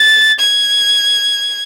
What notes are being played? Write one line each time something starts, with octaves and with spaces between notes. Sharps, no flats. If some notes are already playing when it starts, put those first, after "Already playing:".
Already playing: A6
G#6